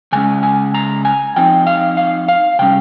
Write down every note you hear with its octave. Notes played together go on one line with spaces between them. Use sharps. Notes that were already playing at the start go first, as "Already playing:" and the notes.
C#3 G#3 C#4 G#5
G#5
A#5
G#5
F3 C4 D#4 G5
F5
F5
F5
C3 G3 C#4 G5